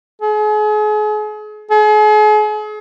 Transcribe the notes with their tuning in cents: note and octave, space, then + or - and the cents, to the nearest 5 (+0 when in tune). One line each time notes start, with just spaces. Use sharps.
G#4 +40
G#4 +40